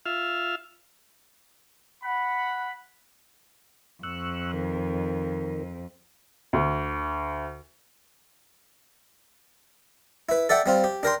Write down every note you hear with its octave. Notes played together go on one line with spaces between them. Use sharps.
F4 E5 F5
F#5 B5
F2 C#6 E6 F#6
D#3 A#4
D2
E4 B4
A4 D5 E5 F#5 G5
G3 C4 F4
G4
D4 A#4 G5 C6